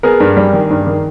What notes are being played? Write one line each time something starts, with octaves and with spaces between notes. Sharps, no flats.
B3 G#4 A#4
G2
G3
D#3
G2
D#3